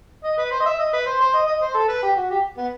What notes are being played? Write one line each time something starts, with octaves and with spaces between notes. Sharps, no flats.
D#5
B4
C5
D#5
E5
D#5
B4
C5
C5
D#5
D#5
C5
A4
B4
G4
F#4
G4
B3